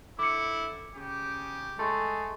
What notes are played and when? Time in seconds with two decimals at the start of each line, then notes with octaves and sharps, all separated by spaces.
0.19 D3 E4 D6 C#7
0.95 C#3 G4
1.79 G#3 A3